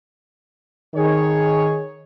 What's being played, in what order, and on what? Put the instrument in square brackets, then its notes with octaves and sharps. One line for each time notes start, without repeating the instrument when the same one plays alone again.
[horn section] D#3 G#4 C#5